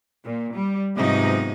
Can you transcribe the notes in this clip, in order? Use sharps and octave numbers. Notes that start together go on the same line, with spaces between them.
A#2
G3
G#2 C3 F3 F#3 B3 D#4